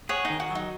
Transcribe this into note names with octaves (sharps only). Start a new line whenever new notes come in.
G#4 C#5 F#5
D#4
D#3
F#4
F#3 D#4